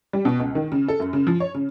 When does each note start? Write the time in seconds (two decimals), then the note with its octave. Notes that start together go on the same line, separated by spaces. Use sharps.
0.13 G3
0.25 B2
0.39 C#2
0.55 D#3
0.72 C#3
0.88 A4
1.00 F#2
1.13 C#3
1.27 F3
1.40 C#5
1.55 C#3